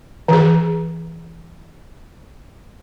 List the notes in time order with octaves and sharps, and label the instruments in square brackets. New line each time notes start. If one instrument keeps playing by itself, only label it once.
[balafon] E3 G#4